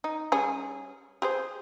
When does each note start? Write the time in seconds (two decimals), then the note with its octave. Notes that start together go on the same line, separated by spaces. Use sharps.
0.04 D#4
0.32 G3 C#4 G#4
1.22 G4 G#4 C5